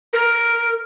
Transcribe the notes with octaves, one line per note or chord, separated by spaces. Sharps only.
A#4